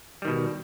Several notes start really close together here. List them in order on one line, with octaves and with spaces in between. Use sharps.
G3 D#3 B2